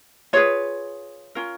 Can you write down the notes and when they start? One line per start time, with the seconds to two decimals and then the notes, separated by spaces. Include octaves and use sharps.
0.33 F4 G#4 B4 C#5
1.35 C#4 F4 A#4